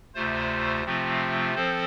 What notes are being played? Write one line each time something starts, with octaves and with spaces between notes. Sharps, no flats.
D2 C3 A3 F4 C5
C3 F3 A3 C4 F4
F3 C4 A4 C5